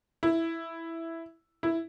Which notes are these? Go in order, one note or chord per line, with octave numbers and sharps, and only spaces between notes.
E4
E4